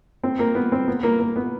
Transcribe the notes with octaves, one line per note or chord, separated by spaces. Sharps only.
C4
A#3
B3
C4
B3
A#3
A#3
B3